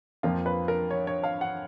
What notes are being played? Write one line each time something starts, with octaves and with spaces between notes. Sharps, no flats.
F2 F3 A#3 F4
B4
A#4
C#5
C#5
F5
F#5